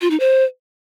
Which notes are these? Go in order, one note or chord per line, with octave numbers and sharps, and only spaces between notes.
F4
D#4
C5